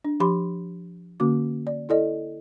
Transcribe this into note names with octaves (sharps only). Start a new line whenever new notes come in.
D4
F3 G4 B5 C6 D6
D3 A#3 C#4 F#4 D6
D5
E4 A4 D5 D#5